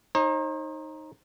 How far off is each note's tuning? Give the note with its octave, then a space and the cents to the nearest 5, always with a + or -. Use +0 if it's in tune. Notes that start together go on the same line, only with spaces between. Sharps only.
D#4 +0 C5 +45